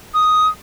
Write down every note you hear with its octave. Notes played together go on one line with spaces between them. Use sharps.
D#6